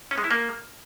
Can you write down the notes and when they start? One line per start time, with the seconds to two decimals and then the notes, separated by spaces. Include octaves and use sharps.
0.11 C#4
0.18 G#3
0.24 E4
0.31 A#3